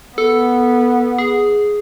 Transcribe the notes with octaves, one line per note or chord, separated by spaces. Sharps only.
B3 A4
G#4